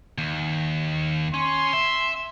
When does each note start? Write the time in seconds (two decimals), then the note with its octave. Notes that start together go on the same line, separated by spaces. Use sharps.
0.18 D#2
1.34 C#4 C6
1.73 E5